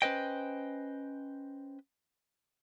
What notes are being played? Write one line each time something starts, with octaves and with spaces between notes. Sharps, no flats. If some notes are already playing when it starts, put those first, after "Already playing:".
C#4 B4 C5 D#5 G5